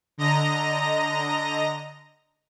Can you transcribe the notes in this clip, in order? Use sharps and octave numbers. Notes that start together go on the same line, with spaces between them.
D3 D#5 A#5 A#6